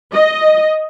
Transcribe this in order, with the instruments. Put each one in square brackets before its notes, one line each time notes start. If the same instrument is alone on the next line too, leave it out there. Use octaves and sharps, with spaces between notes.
[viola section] D#5